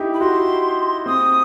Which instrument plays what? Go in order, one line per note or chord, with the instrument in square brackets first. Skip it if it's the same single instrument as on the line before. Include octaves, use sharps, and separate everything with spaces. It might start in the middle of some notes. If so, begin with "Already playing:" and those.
Already playing: [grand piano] D#4 E4 G4
[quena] B5
[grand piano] F#4 [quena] C6
[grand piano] C4 [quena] D#6